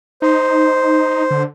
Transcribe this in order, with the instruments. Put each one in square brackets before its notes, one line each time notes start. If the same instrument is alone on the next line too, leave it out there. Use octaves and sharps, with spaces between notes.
[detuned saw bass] D#4 [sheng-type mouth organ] C5
[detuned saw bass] D3